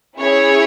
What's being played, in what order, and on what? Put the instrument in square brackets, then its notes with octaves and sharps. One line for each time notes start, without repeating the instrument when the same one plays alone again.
[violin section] C#4 E4 G#4 C#5